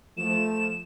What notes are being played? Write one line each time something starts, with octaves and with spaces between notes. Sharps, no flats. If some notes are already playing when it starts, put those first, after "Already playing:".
F3 A3 E7